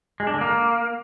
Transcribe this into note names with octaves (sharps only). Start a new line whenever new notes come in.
G#3
D4
D3
A#3